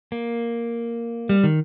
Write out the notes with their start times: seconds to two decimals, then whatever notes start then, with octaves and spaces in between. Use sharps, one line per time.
0.12 A#3
1.29 G3
1.44 D#3